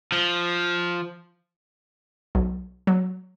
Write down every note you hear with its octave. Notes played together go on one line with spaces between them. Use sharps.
F3
B1
F#3